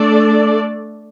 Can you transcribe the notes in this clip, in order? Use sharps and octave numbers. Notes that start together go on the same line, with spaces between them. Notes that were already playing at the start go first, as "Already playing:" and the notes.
Already playing: A3 D4 A4 D5